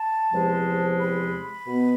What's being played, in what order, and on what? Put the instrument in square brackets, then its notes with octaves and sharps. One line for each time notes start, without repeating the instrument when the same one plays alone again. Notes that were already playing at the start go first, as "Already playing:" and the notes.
Already playing: [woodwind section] A5
E2 C3 F3 G#3
B5
B2 B3